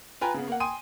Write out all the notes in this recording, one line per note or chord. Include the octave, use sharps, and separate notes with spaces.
F4 B4 G5 G#5 A#5
C#3 B3
A#3 F#5
G5 G#5 C6 D#6 D#7